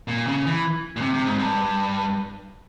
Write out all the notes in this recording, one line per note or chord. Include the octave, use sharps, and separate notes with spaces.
A#2
C#3
E3
A#2
C3
C3
G#2
G2